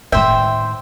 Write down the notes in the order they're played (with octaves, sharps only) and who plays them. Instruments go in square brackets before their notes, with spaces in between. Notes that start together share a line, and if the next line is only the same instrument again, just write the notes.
[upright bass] A2 D#3 [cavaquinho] C5 G5 [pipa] E5